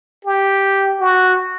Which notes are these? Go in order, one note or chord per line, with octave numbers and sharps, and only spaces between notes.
G4
F#4